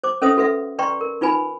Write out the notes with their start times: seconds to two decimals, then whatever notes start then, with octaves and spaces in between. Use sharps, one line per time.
0.04 C5 D6
0.22 C#4 A4 B4 C5 E5 D#6
0.37 F#4 A4 B4 E5 F#5
0.79 B4 D5 G5 A#5 C6 C#6
1.01 A#4
1.21 D#4 F4 B4 G#5 B5